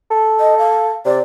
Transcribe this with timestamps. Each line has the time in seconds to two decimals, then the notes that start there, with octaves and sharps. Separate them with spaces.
0.11 A4
0.40 D#5
0.59 F5
1.06 C3 D5